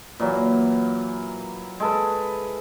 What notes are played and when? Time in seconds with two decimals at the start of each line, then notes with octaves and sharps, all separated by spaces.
0.20 A#2 E3 F#3
1.80 G#3 A4 B4